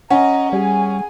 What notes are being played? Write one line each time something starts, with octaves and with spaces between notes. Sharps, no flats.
C#4 D#5 F#5 A#5
G3 G#4 G#5